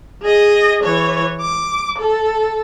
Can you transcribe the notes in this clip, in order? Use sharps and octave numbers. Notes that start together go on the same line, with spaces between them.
G#4 D#5
E3 C#5
D6
A4